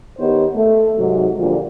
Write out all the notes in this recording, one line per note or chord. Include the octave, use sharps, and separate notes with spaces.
D#3 B3 D#4 G4 C5 C#5
A3
G#2 C3 F#3
A#2 D3 F3 G3